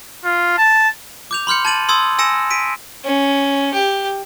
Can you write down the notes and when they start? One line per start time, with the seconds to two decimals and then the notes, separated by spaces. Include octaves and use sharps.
0.24 F4
0.58 A5
1.31 D6 G6 F7
1.47 B5 C6 F6 G6 C#7
1.65 A5 G#6 A6 D#7 F#7
1.89 C6 D#6 E6 G#6 A6
2.19 G#5 E6 A#6 C#7 E7
2.50 B6 D7 D#7
3.05 C#4
3.74 G4